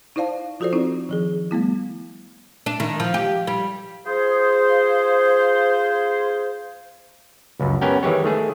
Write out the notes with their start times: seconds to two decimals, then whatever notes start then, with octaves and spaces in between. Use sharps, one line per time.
0.16 D#4 E4 C5 D5 F5 A5
0.60 F3 F4 F#4 A4 C5 D5
0.73 C4 D#4 E4
1.09 D#3 F3 G#4
1.51 G3 A3 B3 E4
2.66 D4
2.80 D#3
3.00 F3
3.14 G4
3.47 G3
4.05 F4 G#4 C5
7.60 C#2 F#2
7.81 B3 C#4 G4 A#4 G5
8.03 D#3 E3 G#3 G4 C#5
8.24 D#3 A3 G#4